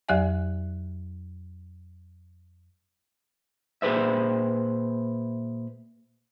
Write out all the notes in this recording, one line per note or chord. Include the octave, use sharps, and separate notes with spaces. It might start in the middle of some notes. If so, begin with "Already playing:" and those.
F2 F#3 G4 D5 E5 G#5
A#2 G#4 B4 C5 E5